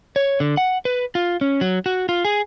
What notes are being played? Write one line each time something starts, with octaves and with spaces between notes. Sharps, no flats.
C#5
D3
F#5
B4
F4
C#4
F#3
F#4
F4
G#4